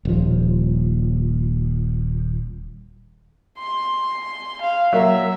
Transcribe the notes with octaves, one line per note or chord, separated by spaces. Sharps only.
D#1 F3
C6
F5
F#3 A#3 E5